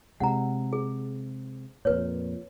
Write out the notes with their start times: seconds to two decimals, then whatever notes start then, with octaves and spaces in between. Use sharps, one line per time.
0.20 C3 G#3 F#5 A#5
0.73 G#4
1.85 F2 A#2 B4 C#5